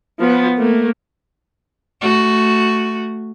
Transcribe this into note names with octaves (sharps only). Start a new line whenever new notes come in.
F3 B3
A3 A#3
A3 F#4